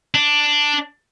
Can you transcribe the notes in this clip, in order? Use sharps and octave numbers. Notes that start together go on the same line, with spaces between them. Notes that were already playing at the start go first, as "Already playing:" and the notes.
D4